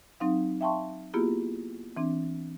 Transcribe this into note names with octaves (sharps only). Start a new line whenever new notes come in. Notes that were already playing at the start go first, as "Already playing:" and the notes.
F#3 C4 D#4 F5
E5 F5 G5 A5 C6 C#6
A#3 B3 E4 F4 G4 G#4
E3 C4 D4